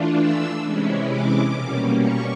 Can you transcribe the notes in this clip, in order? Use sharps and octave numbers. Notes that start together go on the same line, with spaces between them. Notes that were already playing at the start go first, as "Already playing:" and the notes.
Already playing: E3 A3 D4 F4
E6
C3 E3 G#3 C#4 E4
D6
B2 G3 A#3 C#4
C#6